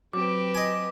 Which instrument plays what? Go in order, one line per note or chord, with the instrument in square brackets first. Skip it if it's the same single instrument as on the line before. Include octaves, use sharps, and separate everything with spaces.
[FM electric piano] F#3 [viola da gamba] C4 G4 B4 [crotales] D6
[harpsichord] D#5 G#5